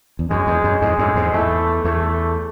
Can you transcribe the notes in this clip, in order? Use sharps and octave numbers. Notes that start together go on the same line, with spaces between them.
E2
F#2 G#3
E2
F#2
E2 G#2 G#3
F#2 A2
E2 G#2
E2 A3
E2 A3